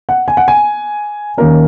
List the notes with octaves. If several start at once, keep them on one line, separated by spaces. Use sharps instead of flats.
F#5
G#5
F#5
G#5
D#2 D#3 A#3 C#4 A#4